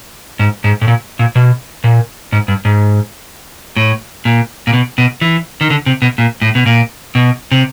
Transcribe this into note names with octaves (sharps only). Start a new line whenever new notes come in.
G#2
G#2
A2
A#2
A#2
B2
A#2
G#2
G2
G#2
A2
A#2
A#2
B2
B2
E3
D#3
D3
C3
B2
A#2
A2
B2
A#2
B2
C3